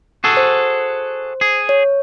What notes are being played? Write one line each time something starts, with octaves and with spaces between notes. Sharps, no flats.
F#4 G#4 A4
C5
G#4
C#5